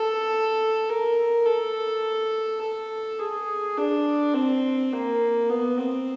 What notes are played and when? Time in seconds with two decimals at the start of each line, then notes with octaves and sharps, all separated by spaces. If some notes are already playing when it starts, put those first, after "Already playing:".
Already playing: A4
0.89 A#4
1.46 A4
2.61 A4
3.19 G#4
3.77 D4
4.34 C4
4.92 A#3
5.50 B3
5.78 C4